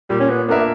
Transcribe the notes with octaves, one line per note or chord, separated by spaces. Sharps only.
A#2 G3
C#4
B3
A#3 B3 D4 A#4 E5